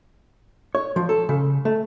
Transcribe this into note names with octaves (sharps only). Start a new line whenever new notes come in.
C#5
F3
A4
C#3
A3